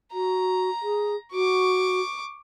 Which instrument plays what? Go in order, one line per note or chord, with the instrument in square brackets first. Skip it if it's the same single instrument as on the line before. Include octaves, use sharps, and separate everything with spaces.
[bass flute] F#4 [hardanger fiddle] A#5
[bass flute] G#4
[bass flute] F#4 [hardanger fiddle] C#6 D6